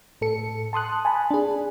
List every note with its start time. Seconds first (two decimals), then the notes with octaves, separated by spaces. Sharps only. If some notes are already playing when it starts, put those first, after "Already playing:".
0.21 A2 A4 C#7
0.73 A5 C6 D#6 F#6
1.05 G#5 A5 B5
1.31 D4 G#4